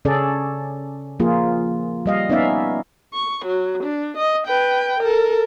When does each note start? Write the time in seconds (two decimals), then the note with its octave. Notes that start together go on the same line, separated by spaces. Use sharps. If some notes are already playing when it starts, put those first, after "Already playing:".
0.05 C#3 C#4 G#4 A4 D5
1.20 F3 A#3 F4 G#4
2.06 G3 D#5 F5
2.29 B3 C#4 D#4 D5 E5 F5
3.14 C#6
3.45 F#3
3.84 D4
4.17 D#5
4.47 B4 G5
5.00 A4 A#4